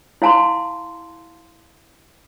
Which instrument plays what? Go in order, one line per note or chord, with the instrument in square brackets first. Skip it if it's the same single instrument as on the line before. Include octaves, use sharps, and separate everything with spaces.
[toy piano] E4 F5 A5 A#5 C6